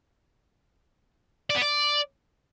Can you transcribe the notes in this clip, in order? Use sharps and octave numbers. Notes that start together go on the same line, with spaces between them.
D5
B3
D5